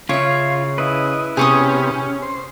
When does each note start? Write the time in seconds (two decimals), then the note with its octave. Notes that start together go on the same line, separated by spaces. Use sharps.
0.09 C#3 F4 C#5 E5
0.78 E4 B4 D#5
1.37 C3 B3 C#4 G4 G#4 C#6 D#6
2.22 C5